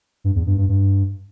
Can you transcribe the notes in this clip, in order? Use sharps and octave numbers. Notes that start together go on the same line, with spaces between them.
G2
E2
G2
G2
G2